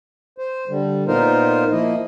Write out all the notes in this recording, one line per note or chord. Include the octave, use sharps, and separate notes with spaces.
C5
D3 G3
A#2 B3 D#4 F4 A#4 C5
F3 A#3 E4 D#5